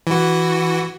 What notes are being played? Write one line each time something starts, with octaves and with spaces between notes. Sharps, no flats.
E3 F#4